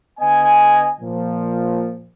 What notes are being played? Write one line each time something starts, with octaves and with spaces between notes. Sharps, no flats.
D3 B3 D#5 G#5
A#2 F3